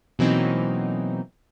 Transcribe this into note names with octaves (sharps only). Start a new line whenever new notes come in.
B2 E3 F#3 A#3 C4 D#4